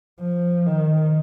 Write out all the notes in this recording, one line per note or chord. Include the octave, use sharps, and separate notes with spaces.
F3
D#3